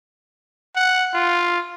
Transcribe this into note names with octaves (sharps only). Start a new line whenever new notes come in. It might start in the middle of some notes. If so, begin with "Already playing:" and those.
F#5
F4